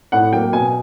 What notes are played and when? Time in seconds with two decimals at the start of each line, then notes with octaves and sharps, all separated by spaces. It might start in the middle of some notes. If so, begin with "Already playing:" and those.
0.12 A2 F#5
0.32 F#3 A#3 G5
0.53 B2 G#5